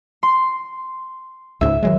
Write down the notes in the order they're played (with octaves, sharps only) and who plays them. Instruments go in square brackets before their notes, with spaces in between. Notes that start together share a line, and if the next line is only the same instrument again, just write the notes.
[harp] C6
[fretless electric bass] C#2 G#2 C#3 [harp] E5
[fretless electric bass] D#3 F#3 G#3